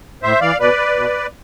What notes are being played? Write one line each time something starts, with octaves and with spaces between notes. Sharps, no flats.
A2 C5 E5
E3 D5 F5
B2 B4 D5
B2